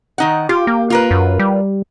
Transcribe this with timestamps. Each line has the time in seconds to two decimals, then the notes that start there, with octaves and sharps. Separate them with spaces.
0.18 D#3 D#4 F#5
0.49 F4 G4
0.67 A#3
0.90 F4 A#4 B4
1.11 F#2
1.39 G3